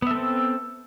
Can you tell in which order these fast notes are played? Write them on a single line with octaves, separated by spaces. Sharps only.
B3 E5 A4 C4